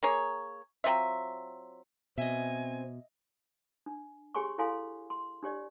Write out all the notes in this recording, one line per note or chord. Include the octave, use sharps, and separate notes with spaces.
A#3 G#4 C#5
F#3 C4 F4 E5
B2 C4 D#5 E5 G#5
D4
G4 G#4 C#5 G#5 C6 C#6
E4 A4 C#5 F5 G#5 C6
C6
D4 G4 C#5 D5